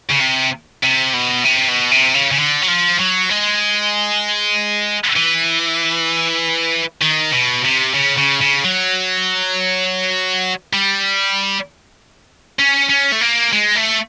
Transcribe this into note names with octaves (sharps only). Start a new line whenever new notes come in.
C#3
C3
C3
B2
C3
B2
C3
C#3
C#3
D3
F#3
F3
F#3
G#3
E3
D#3
B2
C3
C#3
C#3
C#3
F#3
G3
C#4
C#4
A3
A#3
G#3
A3